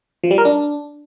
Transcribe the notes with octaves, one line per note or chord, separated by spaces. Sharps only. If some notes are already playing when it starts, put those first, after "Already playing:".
F3
G3
A#4
D4